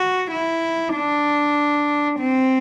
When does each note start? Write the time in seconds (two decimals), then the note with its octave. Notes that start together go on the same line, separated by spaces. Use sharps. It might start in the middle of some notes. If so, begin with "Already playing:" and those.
Already playing: F#4
0.31 E4
0.94 D4
2.20 C4